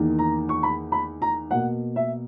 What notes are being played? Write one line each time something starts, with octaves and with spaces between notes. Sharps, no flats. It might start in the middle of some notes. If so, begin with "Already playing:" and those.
Already playing: E2 D#3 A#3
A#5
C#6
B5
B5
A#5
B2 A#3 F#5
E5